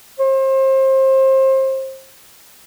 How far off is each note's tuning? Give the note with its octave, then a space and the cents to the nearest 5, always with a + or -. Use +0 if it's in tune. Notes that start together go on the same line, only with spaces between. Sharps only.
C5 +30